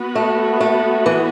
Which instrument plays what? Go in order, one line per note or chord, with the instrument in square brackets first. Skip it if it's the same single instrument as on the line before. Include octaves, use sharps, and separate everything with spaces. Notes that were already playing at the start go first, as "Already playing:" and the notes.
Already playing: [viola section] B3 F#4 B4
[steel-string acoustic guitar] A3
A3
E3